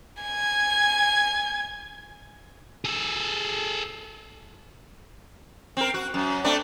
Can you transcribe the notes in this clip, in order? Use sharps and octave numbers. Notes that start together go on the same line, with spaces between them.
G#5 G#6
G#4 A4
C4 A#4
F#4
F#2
A3 C4 D4